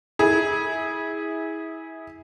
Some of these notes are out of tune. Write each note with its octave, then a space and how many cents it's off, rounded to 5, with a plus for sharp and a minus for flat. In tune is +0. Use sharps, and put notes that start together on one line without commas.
E4 -25 G#4 -5